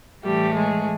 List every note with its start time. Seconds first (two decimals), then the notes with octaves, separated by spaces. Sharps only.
0.24 A2 E3 G3 A3 G4
0.56 G#3 G#4